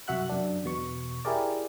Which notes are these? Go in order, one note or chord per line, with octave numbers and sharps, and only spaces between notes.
C2 F#2 F#4 E5 F#5 F#6
F#2 D4
E2 B2 C#6
E4 G4 G#4 A#4 D5